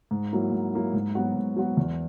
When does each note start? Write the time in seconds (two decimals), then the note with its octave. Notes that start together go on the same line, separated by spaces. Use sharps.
0.11 G#2
0.32 F#3 A#3 E4
0.52 G#2
0.73 F#3 A#3 E4
0.93 G#2
1.15 F#3 B3 F#4
1.35 G#2
1.57 F#3 B3 F#4
1.77 E2